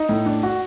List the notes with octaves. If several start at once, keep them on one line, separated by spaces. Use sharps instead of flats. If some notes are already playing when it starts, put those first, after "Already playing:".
Already playing: D#4
A2
D4
F#4